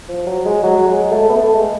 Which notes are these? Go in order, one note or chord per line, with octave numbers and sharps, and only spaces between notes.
F3
F#3
G#3
F#3
G#3
A3
B3
A3
G#3